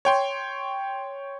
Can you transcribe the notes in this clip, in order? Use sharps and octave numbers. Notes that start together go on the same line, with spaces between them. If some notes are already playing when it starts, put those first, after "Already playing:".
C#5 G5 C6